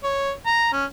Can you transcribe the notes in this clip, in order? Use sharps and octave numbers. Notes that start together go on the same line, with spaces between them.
C#5
A#5
C#4